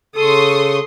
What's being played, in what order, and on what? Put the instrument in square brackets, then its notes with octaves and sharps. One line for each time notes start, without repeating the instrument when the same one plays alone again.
[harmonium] C#3 [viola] A4 [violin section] C6 C#6 D#6